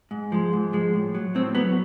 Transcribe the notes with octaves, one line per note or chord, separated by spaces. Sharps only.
G#2
F3 G#3
G#2
F3 G#3
A2
F#3
A2 C4
F#3 B3